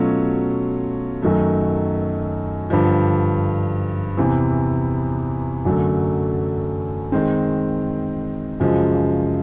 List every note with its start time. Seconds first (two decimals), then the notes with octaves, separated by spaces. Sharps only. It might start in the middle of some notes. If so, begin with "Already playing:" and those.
Already playing: B2 F#3 A3 C#4 F4
1.22 F#2 D#3 F#3 A3
2.70 G2 D3 F3
4.17 E2 C3 E3
5.65 F#2 D3 F#3 A3
7.12 D#3 G#3 C4
8.60 F#2 C#3 F3 G#3